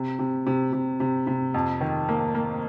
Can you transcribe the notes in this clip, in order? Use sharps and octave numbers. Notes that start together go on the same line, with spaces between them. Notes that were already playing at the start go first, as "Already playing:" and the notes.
Already playing: C3
C3
C3
C3
C3
C3
F2
D#3
A#3
A#3